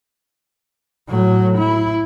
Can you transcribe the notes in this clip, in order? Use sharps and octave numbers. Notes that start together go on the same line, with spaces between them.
A2 F#3
E4